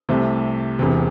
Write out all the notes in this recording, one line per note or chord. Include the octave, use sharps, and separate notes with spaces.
C2 C3 A3
E1 E2 C3